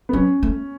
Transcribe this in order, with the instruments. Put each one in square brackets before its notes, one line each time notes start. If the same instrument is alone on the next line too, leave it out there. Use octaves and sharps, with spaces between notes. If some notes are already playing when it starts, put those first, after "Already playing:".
[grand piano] B3
[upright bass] F#3 [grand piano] C#4
[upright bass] A3